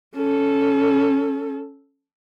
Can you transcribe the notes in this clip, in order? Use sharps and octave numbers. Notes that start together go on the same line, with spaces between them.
C#4 A4